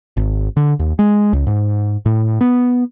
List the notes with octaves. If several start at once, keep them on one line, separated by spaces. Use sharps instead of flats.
G#1
D3
D#2
G#3
C#2
G#2
A2
B3